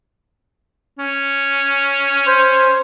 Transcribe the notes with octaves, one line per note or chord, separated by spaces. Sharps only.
C#4
C5